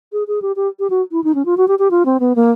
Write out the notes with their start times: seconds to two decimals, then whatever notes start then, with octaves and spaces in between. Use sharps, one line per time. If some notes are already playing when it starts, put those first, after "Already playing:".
0.13 G#4
0.27 G#4
0.42 G4
0.56 G4
0.79 G4
0.90 F#4
1.12 E4
1.24 D#4
1.35 C#4
1.45 F4
1.57 F#4
1.68 G4
1.79 G4
1.91 F4
2.05 C4
2.20 B3
2.36 A#3